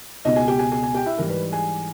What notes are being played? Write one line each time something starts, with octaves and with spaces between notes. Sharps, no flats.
C#2 B2 G#3 D#4 D#5
G#4 G#5
G4 G5
G#4 G#5
G#4 G#5
G#4 G#5
G4 G5
E4 E5
G#2 E3 G3 A#4
B4
G#4 G#5